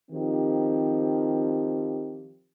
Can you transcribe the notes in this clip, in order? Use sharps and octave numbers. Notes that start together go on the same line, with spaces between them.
D#3 F3 C4 G4